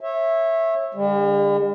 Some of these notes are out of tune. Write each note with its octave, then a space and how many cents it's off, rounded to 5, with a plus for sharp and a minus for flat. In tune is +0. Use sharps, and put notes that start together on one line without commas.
C#5 -25 E5 +0
D3 +0 G3 +45